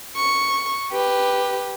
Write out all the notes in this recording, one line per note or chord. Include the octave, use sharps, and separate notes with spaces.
C#6
G4 B4